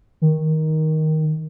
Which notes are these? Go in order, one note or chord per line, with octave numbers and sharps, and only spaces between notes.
D#3